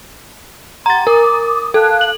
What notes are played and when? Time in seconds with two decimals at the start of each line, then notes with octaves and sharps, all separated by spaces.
0.86 G4 F#5 A#5 C6 A6
1.07 A#4 D6 D#6
1.74 A4 F5 A5 F#6
2.01 F#7